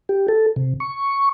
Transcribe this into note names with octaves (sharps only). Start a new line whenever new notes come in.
G4
A4
C3
C#6